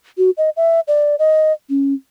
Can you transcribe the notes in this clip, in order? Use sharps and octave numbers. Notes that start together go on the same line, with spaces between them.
F#4
D#5
E5
D5
D#5
C#4